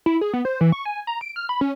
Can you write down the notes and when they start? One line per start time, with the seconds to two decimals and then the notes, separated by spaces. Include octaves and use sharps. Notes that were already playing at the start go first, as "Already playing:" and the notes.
0.06 E4
0.21 G#4
0.33 B3
0.45 C5
0.61 E3
0.72 C#6
0.85 G#5
1.07 A#5
1.21 D7
1.36 F6
1.49 B5
1.61 C#4